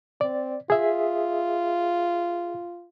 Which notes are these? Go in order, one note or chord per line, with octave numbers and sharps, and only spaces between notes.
C4 D5
F4 G#4 E5